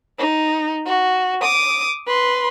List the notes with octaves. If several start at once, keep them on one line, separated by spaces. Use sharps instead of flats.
D#4
F#4
D6 D#6
B4 C6